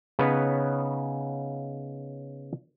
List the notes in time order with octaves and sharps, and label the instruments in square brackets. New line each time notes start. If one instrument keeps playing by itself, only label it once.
[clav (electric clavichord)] C#3 B3 D#4 B4 C#5